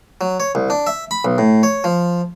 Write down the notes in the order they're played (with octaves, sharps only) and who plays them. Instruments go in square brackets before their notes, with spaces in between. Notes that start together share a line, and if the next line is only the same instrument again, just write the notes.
[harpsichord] F#3
C#5
C2
D4
E5
B5
B1
A2
C#5
F3